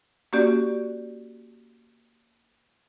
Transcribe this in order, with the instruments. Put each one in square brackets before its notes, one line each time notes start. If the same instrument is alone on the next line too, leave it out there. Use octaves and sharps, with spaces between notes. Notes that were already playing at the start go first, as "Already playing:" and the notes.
[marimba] A#3 C#4 F#4 G4 D5